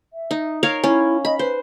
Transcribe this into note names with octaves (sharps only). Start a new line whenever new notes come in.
E5
D#4
A#4 C#5 F5
C#4 E4
D#5 B5
B4 C5